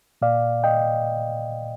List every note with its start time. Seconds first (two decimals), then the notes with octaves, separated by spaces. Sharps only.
0.22 A#2 D5 F5
0.64 D#5 G5